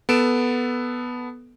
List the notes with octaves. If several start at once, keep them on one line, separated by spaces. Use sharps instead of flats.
B3 A4 D7 E7